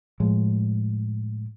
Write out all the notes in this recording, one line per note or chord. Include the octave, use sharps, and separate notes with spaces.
A2 F3 G#3